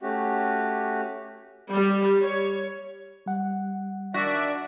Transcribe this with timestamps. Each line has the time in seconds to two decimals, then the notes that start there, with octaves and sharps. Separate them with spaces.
0.01 A3 C#4 F#4 G4
1.72 G3
2.21 C#5
3.26 G3 F#5
4.14 D#3 D4 F#4 D5 E5